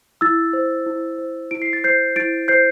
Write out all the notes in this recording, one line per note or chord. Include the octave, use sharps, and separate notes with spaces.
E4 E6 A6
C5
E4
C5
E4 D7
C7
A6
C5 G6 C7
E4 A6 D7
C5 G6 C7